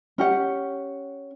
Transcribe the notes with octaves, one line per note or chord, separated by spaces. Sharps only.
C#4 G4 F#5